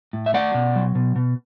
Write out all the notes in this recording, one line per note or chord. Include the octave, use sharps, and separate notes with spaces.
A2
E5
A3 D5 F#5
B2
F#3
B2
B2